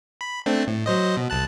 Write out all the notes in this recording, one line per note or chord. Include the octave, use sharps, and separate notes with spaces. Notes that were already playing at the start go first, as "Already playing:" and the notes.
B5
A3 C4 D4
A2
F#3 C5 D#5
B2
C2 A5 F#6